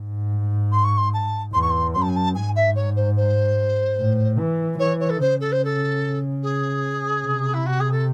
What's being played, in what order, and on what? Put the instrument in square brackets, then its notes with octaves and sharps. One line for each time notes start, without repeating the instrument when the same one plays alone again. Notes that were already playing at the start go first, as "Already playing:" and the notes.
Already playing: [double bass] G#2
[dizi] C6
C#6
C6
A5
[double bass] E2 [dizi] C6
[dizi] C#6
C6
[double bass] F#2 [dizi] C6
[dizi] A5
G#5
A5
[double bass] G#2 [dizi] G#5
[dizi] E5
C#5
C5
C5
[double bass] A2
E3
[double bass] E3 [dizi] C#5
[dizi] C#5
A4
[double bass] C#3 [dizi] C5
[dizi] A4
C5
A4
G#4
[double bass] C3
[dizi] E4
F#4
G#4
A4